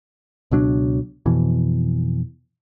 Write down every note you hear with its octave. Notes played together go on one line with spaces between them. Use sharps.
C#2 B2 F#3 D4
F2 B2 E3